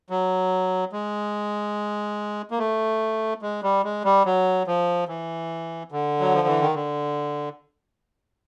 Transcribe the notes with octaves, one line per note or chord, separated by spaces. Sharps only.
F#3
G#3
A#3
A3
G#3
G3
G#3
G3
F#3
F3
E3
D3
F#3
F3
E3
D#3
D3